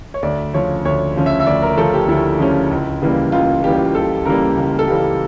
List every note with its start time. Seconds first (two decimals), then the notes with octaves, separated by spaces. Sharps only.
0.14 C#5
0.23 D2 D5
0.54 C#3 F3 C#4 C#5
0.85 D2 C#5
1.16 C#3 F3 C#4
1.26 E5
1.40 E5
1.47 D2 D5
1.62 A#4
1.77 C#3 F3 C#4 A4
1.94 G4
2.08 D2 E4
2.40 C#3 F3 C#4
2.71 C#2
3.02 C#3 E3 G3 A#3
3.32 C#2 F4
3.64 C#3 E3 G3 A#3 G4
3.95 C#2 A4
4.26 C#3 E3 G3 A#3 A#4
4.57 C#2
4.79 A4
4.87 C#3 E3 G3 A#3 G4